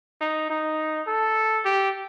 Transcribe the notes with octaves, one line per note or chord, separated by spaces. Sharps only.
D#4
D#4
A4
G4